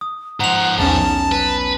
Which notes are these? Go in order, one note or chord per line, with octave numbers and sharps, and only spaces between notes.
D#6
G#2 F3 F#5 A#5 F7
B1 E2 C#4 A5
B4